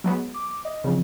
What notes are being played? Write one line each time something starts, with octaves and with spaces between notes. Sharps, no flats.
F#3 G#3 B3
D6
D#5
C#3 E3 F3 C4